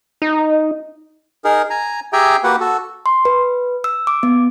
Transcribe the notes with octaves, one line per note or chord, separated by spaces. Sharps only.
D#4
D#4 G#4 A#4
G#5 A#5
G4 G#4 E5 G5 G#5 A#5
A#3 F#4 G4 B4 F#5
F#4 A4
C6
B4
E6
D6
B3